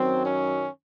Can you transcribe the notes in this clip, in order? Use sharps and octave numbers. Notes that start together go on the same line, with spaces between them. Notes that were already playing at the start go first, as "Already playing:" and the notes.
Already playing: F#2 D#3 F#3 C4
C#4